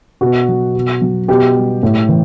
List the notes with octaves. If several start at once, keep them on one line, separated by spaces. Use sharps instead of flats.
B2 F#4
F#3
B2
F#3
B2 G4
G3
A2
E3